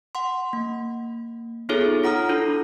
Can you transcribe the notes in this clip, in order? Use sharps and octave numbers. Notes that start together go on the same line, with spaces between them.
F#5 C6
A#3
B3 D#4 F4 G#4 A4 C#5
F4 F#5 A#5 D#6 F6
D4 E4 F#4 A4